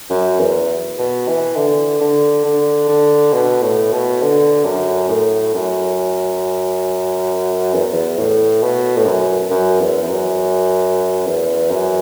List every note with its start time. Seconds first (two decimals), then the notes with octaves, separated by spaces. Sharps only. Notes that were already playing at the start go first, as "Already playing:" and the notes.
0.10 F#2
0.39 E2
0.99 B2
1.28 E3
1.56 D3
2.01 D3
2.45 D3
2.89 D3
3.33 B2
3.63 A2
3.93 B2
4.22 D3
4.65 F#2
5.10 A2
5.54 F#2
7.74 E2
7.92 E2
8.18 A2
8.63 B2
8.97 A2
9.06 F#2
9.51 F#2
9.80 E2
10.03 E2
10.09 F#2
11.26 E2
11.70 F#2